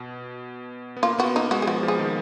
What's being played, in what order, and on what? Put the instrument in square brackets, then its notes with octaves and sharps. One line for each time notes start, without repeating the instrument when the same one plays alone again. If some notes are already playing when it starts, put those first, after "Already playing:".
Already playing: [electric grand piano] B2
B3
[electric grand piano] A#3 [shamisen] F4
[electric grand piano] B3 [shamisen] F#4
[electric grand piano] A#3 [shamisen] D#4
[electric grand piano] G#3 [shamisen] F#4
[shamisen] G#4
[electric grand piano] F3 [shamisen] F#4
[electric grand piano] F3
[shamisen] G#4
[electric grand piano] D#3